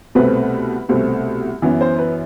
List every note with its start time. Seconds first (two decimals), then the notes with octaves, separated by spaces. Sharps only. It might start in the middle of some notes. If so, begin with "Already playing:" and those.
0.15 C2 B2 A3 C4 B4
0.89 C2 B2 A3 C4
1.62 F#2 E3 B3
1.81 C5
1.99 B4